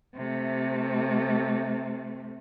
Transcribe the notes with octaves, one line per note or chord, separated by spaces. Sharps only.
C3 A3